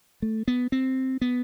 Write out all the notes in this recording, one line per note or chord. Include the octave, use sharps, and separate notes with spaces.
A3
B3
C4
B3